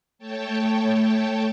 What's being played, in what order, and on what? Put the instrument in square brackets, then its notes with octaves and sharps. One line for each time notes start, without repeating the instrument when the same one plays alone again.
[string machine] A3 C#5 G5 A5